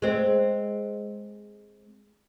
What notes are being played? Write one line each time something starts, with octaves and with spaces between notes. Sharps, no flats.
G#3 C4